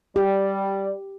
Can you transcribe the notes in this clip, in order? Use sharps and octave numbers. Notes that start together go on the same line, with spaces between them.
G3 G4 D5